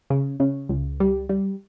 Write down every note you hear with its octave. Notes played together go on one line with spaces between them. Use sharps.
C#3
C#3
C#2
G3
G3